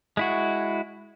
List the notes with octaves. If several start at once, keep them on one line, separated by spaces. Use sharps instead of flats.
G#3 E4 F#4